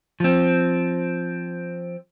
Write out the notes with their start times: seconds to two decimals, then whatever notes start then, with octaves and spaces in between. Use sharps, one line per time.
0.20 F3 C4